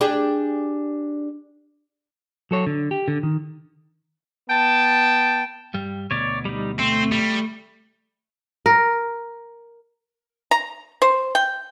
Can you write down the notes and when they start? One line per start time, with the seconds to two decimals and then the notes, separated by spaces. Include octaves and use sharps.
0.01 D4 G4 G#4
2.51 F#3 A4 C#5
2.66 D3
2.91 G4
3.08 D3
3.23 D#3
4.49 B3 G5 A5
5.74 G2 G3
6.11 D2 B2 C#5 D5
6.45 G3 D#4
6.79 A3 C4
7.12 G3
8.66 A#4
10.51 A#5
11.02 C5
11.35 G5